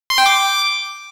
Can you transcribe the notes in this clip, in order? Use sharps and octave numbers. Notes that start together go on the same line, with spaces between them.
C6
G5
D6